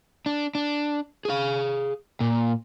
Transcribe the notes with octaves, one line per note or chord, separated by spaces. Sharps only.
D4
D4
G#4 F5
A#2